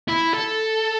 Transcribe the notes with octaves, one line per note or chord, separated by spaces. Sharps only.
E4
A4